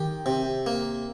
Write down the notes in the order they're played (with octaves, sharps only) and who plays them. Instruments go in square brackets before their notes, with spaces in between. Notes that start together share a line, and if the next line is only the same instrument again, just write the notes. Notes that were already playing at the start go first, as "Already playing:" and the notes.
Already playing: [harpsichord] D#3 G4
C3
A#3